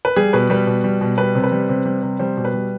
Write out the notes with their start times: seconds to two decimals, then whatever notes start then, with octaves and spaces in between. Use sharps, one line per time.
0.05 B4
0.16 G3 G#4
0.33 B2 B4
0.50 G3 B4
0.67 B2
0.84 G3
1.01 B2
1.18 G3 B4
1.35 C3
1.44 B4
1.52 G3
1.69 C3
1.85 G3
2.03 C3
2.19 G3 C5
2.37 B2
2.45 B4
2.54 G3